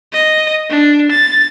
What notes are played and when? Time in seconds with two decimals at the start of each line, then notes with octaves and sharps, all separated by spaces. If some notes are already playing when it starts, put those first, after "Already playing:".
0.13 D#5
0.70 D4
1.11 A6